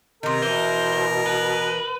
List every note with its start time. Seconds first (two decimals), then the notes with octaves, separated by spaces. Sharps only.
0.23 C3 D#3 A#4
0.42 B2 E3 C5 A#5
1.26 B4